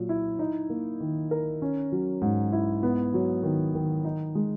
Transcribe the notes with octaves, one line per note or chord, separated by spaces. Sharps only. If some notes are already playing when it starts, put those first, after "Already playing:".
Already playing: A#2 F#3
E4
D#4
A#3
D#3
A#4
C#4
F#3
G#2
E4
B3
F#3
D#3
D#3
D#4
G#3